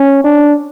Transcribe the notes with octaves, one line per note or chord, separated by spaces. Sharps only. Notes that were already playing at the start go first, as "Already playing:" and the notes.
Already playing: C#4
D4